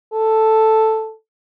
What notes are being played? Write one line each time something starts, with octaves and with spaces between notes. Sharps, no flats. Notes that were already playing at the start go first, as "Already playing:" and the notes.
A4